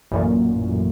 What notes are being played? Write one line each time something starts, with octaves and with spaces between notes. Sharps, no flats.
A1 F#2 A#2